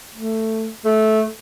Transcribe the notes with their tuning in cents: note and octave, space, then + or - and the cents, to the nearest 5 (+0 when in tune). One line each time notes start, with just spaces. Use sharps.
A3 +10
A3 -15